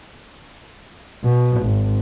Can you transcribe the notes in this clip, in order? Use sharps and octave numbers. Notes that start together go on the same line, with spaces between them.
B2
G#1